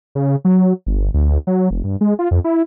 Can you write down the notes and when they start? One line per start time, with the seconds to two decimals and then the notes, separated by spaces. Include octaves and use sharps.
0.15 C#3
0.45 F#3
0.86 G1
1.14 D2
1.47 F#3
1.71 F1
1.84 G2
2.01 G#3
2.19 F4
2.31 F2
2.44 E4